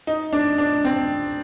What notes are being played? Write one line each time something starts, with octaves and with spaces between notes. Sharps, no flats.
D#4
D4
D4
C4